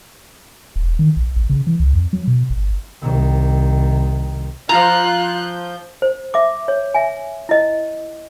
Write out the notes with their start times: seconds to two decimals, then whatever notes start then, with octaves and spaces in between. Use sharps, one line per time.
0.76 E1
0.99 D#3
1.17 A#1
1.36 A1
1.50 C#3
1.67 E3
1.80 C#2
1.93 F2
2.13 F#3
2.27 B2
2.50 G1
3.02 C2 D#3
4.69 F3 F4 A#5 F#6 G6
6.02 C5
6.34 E5 D6
6.68 C#5
6.94 E5 G#5
7.49 E4 D#5